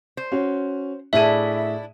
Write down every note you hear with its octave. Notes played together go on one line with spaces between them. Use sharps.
C5
C#4 F#4
A2 D4 E4 G#4 E5 D#7